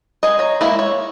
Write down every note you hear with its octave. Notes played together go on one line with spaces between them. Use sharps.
G#4 D#5
C#5 A#5
G#3 A#3 E4
C#5